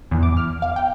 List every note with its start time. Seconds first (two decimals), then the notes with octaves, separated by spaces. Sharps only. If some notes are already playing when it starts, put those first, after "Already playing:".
0.11 E2
0.23 D6
0.37 F6
0.62 F5
0.76 G5